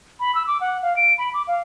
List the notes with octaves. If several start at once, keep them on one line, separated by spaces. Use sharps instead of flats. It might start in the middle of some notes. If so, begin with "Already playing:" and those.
B5
E6
D6
F#5
F5
D7
B5
D6
F5